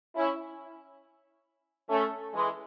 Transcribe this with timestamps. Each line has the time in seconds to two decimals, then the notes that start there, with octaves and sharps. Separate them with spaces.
0.15 C#4 E4
1.89 A3 C#4
2.34 E3 G#3